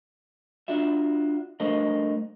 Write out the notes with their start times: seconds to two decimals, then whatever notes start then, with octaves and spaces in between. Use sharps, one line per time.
0.68 D4 F4 F#4 E5
1.60 G3 A3 D4 A#4 C5 D#5